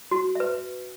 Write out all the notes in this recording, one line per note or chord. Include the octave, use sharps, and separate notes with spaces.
F#4
B4 E5